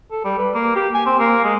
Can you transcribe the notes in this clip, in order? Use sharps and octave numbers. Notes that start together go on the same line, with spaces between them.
A4
G3
B4
A#3
G4
G#5
C4
A#3
G#3